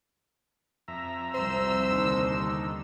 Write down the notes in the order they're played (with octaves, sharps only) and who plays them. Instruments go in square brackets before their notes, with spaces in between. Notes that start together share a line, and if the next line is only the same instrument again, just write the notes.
[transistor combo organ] F2 E5 A#5
[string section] C2 E6 [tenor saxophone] C5
[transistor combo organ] D#2 D3 D#4